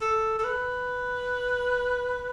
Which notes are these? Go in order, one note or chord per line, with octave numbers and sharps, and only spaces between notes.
A4
A4
B4